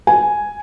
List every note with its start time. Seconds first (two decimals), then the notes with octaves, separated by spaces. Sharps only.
0.07 G#5